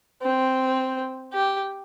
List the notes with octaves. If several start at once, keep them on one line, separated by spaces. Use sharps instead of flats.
C4
G4